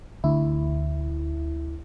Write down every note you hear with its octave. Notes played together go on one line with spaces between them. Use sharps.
D2 E4